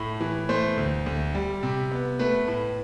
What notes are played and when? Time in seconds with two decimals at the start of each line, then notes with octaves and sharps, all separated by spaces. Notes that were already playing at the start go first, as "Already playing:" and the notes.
Already playing: A2 A3
0.20 E3
0.49 A3 C5
0.77 D2
1.06 D2
1.34 G3
1.63 C3
1.92 B3
2.19 A3 B4
2.48 A2